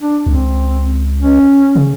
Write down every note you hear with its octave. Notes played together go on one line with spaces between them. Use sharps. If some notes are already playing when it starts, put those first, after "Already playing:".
D4
C#2 C4
C#4
C#3